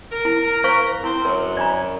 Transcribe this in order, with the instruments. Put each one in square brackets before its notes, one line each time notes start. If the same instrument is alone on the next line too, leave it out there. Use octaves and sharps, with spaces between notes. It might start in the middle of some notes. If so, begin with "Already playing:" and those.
[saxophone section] A#4
[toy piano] E4
C5 F5 C#6
[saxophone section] C4 C5 [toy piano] E4
[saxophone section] F#2 [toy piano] A#4
[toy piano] D5 G#5 A#5